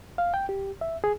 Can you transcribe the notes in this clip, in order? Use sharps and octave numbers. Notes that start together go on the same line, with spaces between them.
F5
G5
G4
E5
G#4